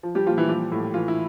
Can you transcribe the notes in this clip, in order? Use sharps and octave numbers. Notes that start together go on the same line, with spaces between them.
F3
G3 G4
A#2 F3 F4
E3 E4
F3 G3 G4
A2
E3 F4
E4